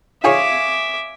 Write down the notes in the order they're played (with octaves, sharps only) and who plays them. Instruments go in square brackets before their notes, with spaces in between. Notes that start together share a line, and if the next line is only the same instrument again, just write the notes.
[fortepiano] F4 G#4 C#5 [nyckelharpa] E5 D6